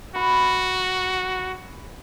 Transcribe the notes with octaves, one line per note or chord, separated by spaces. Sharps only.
F#4 B5